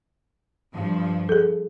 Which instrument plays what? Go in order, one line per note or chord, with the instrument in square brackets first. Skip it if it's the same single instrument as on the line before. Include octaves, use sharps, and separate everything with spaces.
[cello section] G2 F3
[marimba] G#4 A4